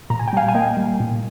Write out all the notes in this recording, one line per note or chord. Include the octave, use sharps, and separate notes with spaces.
A#2 A#5
G#5
G5
G3 F5 G#5
G#5
A#3 D#5 G5
G3
A#2